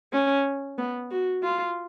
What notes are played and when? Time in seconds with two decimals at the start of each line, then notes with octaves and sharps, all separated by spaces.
0.13 C#4
0.78 B3
1.11 F#4
1.43 F4